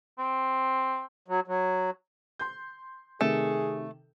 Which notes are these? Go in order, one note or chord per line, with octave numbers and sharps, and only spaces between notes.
C4
F#3
F#3
C6 G6
C3 D#3 A3 G#4